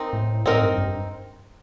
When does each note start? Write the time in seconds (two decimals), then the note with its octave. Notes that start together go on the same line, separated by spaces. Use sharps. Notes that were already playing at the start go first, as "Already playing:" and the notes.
Already playing: C4 D#4 A#4
0.13 A2
0.46 A2 C4 D#4 A#4
0.62 G2
0.78 G2